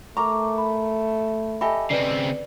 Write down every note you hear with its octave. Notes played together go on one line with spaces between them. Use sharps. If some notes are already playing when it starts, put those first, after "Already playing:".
A3 A#4 A#5 C#6 D6
B5
G4 A4 D#5 E5 G#5 B5
C#3 C4 B4 D5